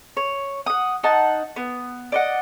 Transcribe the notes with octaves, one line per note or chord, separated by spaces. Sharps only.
C#5
F#5 D#6
D#4 F#5 A5
B3
D5 D#5 F#5